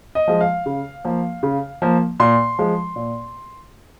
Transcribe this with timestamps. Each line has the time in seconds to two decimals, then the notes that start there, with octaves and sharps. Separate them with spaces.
0.15 D#5
0.28 F3 G#3
0.41 F5
0.66 C#3
1.05 F3 A#3
1.43 C#3
1.82 F3 A#3
2.20 A#2 C6
2.59 F3 G#3
2.96 A#2